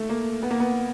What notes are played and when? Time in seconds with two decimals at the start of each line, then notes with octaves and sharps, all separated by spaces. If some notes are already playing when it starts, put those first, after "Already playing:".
Already playing: A3
0.09 A#3
0.43 B3
0.51 A#3
0.60 B3